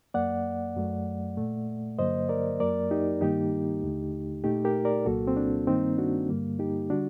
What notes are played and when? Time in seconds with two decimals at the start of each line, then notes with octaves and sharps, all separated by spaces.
0.14 F#2 F#3 A#3 D5 F#5
0.76 F#2 F#3 A3
1.37 A#2 A3
1.99 G2 D3 F#3 A#3 C5 D#5
2.29 A#4 D5
2.60 F#2 F#3 A#3 A#4 D5
2.91 D#4 G4
3.21 G2 D#3 G3 A#3 D#4 G4
3.83 D#2 D3 A3
4.44 A#2 A3 D#4 G4
4.65 G4 A#4
4.85 A#4 D5
5.06 C2 A#2 F#3 A#3 F#4 A4
5.27 C4
5.37 D4
5.67 G2 D#3 G3 A#3 C4 D#4
5.98 D4 F#4
6.29 G2 D3 G3 A#3
6.59 D#4 G4
6.90 D3 G3 D4 F#4